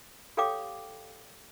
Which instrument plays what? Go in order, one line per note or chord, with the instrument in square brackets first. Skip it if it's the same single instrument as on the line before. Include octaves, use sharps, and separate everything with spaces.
[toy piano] G4 A4 C#5 F5 G5 D6